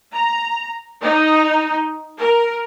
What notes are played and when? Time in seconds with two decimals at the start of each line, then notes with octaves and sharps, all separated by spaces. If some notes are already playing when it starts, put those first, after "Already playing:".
0.12 A#5
1.01 D#4
2.18 A#4